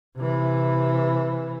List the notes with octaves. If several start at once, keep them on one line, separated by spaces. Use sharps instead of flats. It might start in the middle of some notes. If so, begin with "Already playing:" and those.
C3 E3